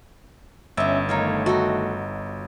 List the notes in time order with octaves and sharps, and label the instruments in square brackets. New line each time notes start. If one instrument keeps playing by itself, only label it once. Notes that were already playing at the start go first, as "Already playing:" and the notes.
[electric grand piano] G1 [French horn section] C#4 [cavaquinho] D#5 E5
[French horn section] D#3 A3 [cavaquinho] D#4 C#5 F5
[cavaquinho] D#4 A4 D#5 [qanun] F#4